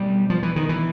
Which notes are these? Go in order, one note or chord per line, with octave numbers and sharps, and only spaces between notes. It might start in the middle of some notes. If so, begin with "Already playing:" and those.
Already playing: B2 G3
F3
E3
D#3
E3